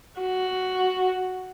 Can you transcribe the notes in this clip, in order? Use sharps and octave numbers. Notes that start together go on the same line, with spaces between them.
F#4